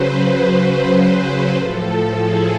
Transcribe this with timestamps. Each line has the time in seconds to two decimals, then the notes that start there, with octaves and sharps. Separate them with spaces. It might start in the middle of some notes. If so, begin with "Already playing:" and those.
Already playing: C#3 F#3 B4 C5
0.29 B4
1.54 A2 F3 A4
2.17 G#4